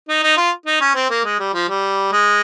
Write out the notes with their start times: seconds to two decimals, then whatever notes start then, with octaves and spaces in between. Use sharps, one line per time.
0.09 D#4
0.23 D#4
0.37 F4
0.66 D#4
0.81 C#4
0.95 C4
1.10 A#3
1.25 G#3
1.39 G3
1.54 F3
1.69 G3
2.12 G#3